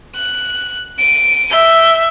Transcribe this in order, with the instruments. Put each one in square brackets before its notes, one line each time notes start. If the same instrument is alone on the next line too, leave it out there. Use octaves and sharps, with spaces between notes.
[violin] F#6
D7 D#7
[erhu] E5 [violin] G6